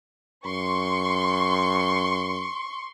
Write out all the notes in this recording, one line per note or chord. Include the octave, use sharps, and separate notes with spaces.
F#2 C6 C#6